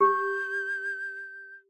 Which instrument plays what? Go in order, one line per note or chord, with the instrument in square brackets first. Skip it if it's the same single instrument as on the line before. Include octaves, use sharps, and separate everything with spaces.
[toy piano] G4 [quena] G6